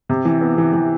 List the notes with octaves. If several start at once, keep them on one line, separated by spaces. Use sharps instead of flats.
C3
E3
B3
E3
E3